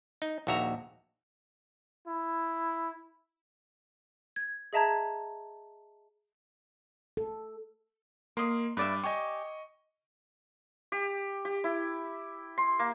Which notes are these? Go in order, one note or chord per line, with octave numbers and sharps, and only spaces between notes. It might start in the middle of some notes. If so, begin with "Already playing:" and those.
D#4
A#1 D#2 F#4 E5 A#5
E4
G#6
G#4 D#5 E5 A5 A#5 G#6
A4
A#3 D#5 C6
G2 B4 D5 E5
G4 D#5 G#5 C#6
G4
G4
E4
C6
A#3